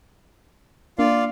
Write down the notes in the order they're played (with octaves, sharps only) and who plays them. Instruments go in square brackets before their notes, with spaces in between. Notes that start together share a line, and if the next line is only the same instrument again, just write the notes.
[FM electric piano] A#3 D4 [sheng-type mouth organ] F4 D5 F5